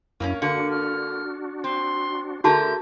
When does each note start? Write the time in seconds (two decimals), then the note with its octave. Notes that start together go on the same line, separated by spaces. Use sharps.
0.20 F#2 A#3 C4 C#4 E4
0.42 D3 A#3 D4 F#4 C#7
0.71 F6
1.64 C4 C6
2.44 D3 A3 F#4 G#4 A#4 A5 G6